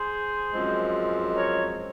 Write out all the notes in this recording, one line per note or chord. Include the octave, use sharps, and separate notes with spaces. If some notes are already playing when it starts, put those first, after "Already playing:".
Already playing: G#4 C5
F#2 F3 G#3 C4
A#4 C#5